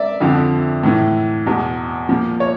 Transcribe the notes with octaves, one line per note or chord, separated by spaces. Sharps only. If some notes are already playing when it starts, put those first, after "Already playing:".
Already playing: D5 E5
F2 D3 F3
A2 E3
E2 B2
A#2 F3
C#5